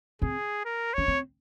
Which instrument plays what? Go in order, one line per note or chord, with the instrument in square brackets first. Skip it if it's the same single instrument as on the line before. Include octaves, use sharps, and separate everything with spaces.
[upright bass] C4 [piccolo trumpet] G#4
[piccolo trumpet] A#4
[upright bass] C#4 [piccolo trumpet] C#5
[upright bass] C4